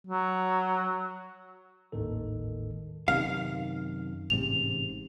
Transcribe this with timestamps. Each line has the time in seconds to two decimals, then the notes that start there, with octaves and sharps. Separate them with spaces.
0.07 F#3
1.92 G#1 D#2 A2 D#3 A4
3.08 F#2 C3 D#3 F5
4.30 A1 G#2 C3 F7